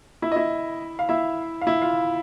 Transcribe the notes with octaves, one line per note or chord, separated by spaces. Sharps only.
E4 E5
D#5
E4 E5
F5
E4 E5
F5
E4 E5
F4 F5